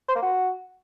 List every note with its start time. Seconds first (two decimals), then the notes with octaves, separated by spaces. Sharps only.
0.08 C5
0.15 A#3
0.22 F#4